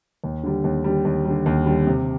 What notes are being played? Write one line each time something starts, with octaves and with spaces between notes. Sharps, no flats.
D#2
D3 G3
D#2
D3 G3
D#2
D3 G3
D#2
D3 G3
C3